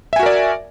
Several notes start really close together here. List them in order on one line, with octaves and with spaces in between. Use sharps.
E5 G#5 F#4 A#4 D5